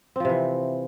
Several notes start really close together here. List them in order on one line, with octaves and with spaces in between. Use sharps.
C4 F3 C3 E3